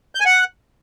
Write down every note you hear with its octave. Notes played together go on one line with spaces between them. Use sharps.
G6
G#5
F#5